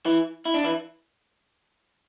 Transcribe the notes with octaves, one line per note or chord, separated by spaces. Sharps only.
E3 E4
E4
D4
E3 E4